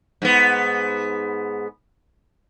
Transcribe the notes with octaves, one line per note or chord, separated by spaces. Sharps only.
G#2 B3